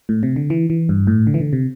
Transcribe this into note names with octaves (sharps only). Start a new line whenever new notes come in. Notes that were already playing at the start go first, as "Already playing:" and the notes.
A2
C3
D3
E3
E3
G2
A2
D3
E3
D3
C3